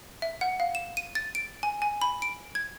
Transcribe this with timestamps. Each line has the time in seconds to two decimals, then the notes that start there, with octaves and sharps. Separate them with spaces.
0.22 E5
0.41 F#5
0.60 F5
0.75 E7
0.97 D#7
1.15 A6
1.35 D7
1.63 G#5
1.82 G#5
2.02 B5
2.22 D7
2.55 G#6